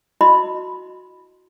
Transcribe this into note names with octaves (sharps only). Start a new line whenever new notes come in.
E4 F#4 D#5 B5 C6